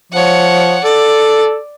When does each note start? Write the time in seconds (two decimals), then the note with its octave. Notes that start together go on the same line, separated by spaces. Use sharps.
0.12 F3 C#5 F#5
0.84 A4 D5